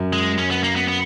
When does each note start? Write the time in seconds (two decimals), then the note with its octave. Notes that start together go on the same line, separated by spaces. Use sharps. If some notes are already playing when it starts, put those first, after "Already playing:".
Already playing: F#2
0.13 G#3
0.38 C#4
0.51 B3
0.63 A#3
0.76 B3
0.88 B3